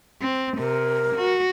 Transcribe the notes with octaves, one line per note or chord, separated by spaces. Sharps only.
C4
C3 A#4
F#4